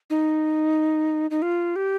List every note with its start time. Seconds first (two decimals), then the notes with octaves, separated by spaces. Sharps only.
0.10 D#4
1.31 D#4
1.42 F4
1.76 G4